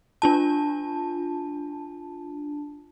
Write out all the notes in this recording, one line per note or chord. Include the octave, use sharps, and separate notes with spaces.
D4 F4 A5